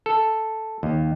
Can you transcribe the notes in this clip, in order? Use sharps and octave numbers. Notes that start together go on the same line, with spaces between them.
A4
D#2